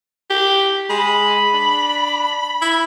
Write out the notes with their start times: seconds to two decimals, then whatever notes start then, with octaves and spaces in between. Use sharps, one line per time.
0.30 G4
0.90 G#3 B5
1.53 D4
2.62 E4